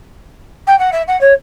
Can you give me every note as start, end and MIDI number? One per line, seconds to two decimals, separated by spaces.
0.67 0.78 79
0.79 0.90 78
0.92 1.02 76
1.08 1.19 78
1.21 1.33 73